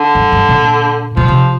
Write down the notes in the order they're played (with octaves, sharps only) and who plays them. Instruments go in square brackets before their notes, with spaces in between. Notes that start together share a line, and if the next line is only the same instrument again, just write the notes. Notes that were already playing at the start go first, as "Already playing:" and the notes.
Already playing: [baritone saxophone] D3
[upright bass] G2
G2
A#2
[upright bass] A#2 [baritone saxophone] F3
[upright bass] C3